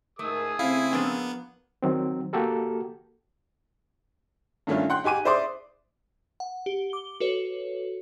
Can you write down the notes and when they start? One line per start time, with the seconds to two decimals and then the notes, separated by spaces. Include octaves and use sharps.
0.19 G#2 A3 D#4 G#4 A#4 D#6 E6
0.59 C#3 A3 C4 E4 F5
0.93 F3 A#3 B3 D4
1.83 D#3 F#3 C4
2.33 A#3 F#4 G4 A4 A#4
4.67 G2 D#3 A3 C#4 D4 F4
4.90 F#5 G5 C6 F#6
5.04 D#4 G4 G#5 D6 D#7
5.25 E4 C5 D5 C6 D6 D#6
6.40 F#5
6.66 G4
6.90 D6 G7
7.20 F#4 A4 B4 C#5